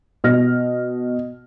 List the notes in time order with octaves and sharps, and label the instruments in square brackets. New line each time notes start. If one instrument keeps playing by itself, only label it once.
[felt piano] B2 F6 A#6